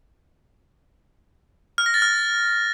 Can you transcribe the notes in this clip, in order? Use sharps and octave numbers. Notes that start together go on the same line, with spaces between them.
F6
A#6
A6
F6